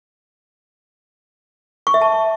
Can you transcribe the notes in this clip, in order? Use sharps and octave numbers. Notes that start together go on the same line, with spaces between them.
C#6
E5
A5